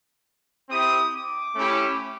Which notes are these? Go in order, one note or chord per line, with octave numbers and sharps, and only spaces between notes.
C4 E4 G4 D#6
D6
A3 C#4 E4 G4